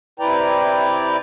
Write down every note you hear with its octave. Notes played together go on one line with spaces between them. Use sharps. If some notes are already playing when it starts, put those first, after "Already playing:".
C3 E4 B4 D5 G5 A#5